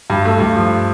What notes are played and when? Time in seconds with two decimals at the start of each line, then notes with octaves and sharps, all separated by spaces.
0.10 G2
0.25 A3
0.40 G2
0.56 F3